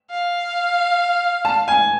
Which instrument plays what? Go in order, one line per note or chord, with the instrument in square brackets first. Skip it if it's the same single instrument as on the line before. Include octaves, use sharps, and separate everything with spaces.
[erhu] F5
[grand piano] A5
G#5